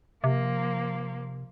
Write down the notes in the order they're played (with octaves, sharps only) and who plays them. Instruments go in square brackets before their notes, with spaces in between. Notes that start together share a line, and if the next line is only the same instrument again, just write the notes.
[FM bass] C3 [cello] F3 A#3